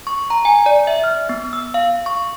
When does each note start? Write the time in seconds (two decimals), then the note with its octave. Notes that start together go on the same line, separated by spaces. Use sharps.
0.07 C#6
0.30 A#5
0.45 G#5
0.66 D5
0.87 E5
1.04 F6
1.29 B3
1.53 E6
1.74 F5
2.06 C#6